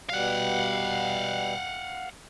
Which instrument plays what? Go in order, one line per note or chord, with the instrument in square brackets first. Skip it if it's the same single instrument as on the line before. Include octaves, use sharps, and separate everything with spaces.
[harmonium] B2 G3 [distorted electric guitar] F5 F#5